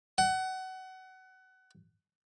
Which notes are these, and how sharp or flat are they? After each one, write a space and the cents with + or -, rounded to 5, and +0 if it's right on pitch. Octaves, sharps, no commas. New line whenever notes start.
F#5 +25